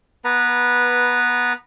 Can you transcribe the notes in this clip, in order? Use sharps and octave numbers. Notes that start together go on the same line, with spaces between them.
B3 B4 A#5